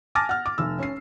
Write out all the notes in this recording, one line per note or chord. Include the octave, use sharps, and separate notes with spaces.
G#5 A5 D6 F6 A6 A#6
F#5 F6
D6
F1 E6
C#4 C7